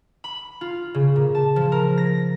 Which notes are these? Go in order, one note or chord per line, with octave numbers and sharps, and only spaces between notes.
B5
F4
C#3
A#2
A5
F3
A#4
A#6